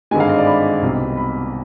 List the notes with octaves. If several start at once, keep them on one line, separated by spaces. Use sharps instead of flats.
G#1 G2 D3 G#3 G#5
F5
D#5
D5
B5
C2 B2 G3
B5